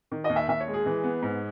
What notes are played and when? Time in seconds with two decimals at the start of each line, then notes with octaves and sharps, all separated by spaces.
0.11 D#3
0.24 D#2 D#5
0.36 E5
0.48 D#2 E5
0.60 C#5
0.67 G#3
0.74 G#4
0.86 E3
1.04 B3
1.22 G#2